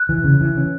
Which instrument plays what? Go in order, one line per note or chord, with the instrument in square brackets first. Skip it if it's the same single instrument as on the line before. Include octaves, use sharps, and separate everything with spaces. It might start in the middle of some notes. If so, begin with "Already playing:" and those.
Already playing: [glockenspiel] F#6
[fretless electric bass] E3
C#3
E3
C#4